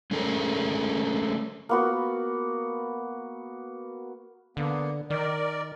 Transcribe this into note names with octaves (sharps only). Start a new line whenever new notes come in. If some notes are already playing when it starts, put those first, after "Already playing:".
G#3 A3 C#4 G#4 A#4
A#3 B3 F#4
D3 A#3 B3
D#3 A#4 D5